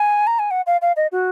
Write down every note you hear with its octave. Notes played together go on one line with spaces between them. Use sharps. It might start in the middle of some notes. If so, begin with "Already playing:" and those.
Already playing: G#5
A#5
G#5
F#5
F5
F5
D#5
F#4